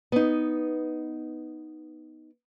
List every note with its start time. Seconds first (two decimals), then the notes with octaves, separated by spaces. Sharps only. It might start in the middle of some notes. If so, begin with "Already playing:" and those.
0.12 B3 D#4